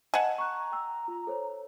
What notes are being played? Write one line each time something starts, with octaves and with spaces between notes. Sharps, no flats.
D#5 F#5 G#5 A5 E7
A#5 C#6 F#6
G5 E6
F4
A4 C5 C#5